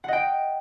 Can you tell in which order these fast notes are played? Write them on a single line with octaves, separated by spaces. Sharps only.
F#5 D#5 G5